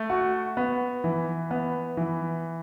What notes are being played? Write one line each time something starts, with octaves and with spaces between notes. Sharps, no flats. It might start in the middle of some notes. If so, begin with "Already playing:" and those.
Already playing: A3
F#4
B3
E3
B3
E3